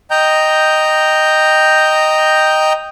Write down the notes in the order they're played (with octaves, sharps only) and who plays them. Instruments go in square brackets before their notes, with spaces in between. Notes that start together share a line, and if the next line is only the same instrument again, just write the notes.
[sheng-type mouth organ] D#5 G5 A#5 G6